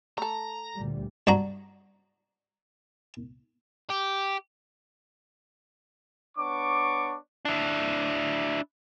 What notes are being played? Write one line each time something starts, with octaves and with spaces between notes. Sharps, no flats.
A3 A4 A#5
D2 A#2 G3
G2 D4 F#4 A#5
G4
B3 D4 C#5 C#6 D6
D4 E4